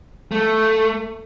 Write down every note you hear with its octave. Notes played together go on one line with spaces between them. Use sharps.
A3